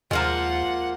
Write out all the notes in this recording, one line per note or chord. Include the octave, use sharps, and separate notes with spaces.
D#2 F3 G#3 A#3 F4 A#4 F#5